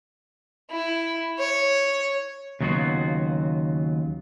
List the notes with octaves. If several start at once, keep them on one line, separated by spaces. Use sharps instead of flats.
E4
C#5
D#2 C#3 F#3 B3 F4 F#4